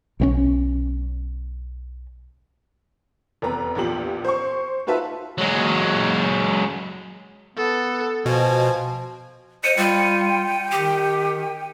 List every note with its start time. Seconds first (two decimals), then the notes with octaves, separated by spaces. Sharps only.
0.20 B1 E3 C#4
3.42 F1 E2 B4 A#5
3.75 A#1 E2 F3 G4 F#7
4.24 C5 C#6
4.87 D#4 F4 F#4 B4 E5 A5
5.38 F#3 G#3
7.56 B3 A4
8.26 B2 F3 G#5
9.64 C5 D#5 C#7 D#7
9.77 G3 F4 G5
10.72 D#3 G4